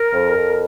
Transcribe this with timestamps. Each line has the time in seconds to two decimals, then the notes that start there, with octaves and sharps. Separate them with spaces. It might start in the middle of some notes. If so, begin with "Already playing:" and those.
Already playing: A#4
0.13 F2
0.35 F2